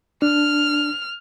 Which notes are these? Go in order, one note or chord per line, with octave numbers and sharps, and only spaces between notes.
D4 F6